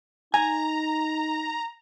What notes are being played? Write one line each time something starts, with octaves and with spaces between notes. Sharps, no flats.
D#4 G#5 A#5